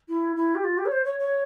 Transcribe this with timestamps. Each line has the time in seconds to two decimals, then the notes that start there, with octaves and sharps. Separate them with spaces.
0.09 E4
0.36 E4
0.55 G4
0.64 F4
0.78 G4
0.86 C#5
0.92 C5
1.05 C#5
1.19 C#5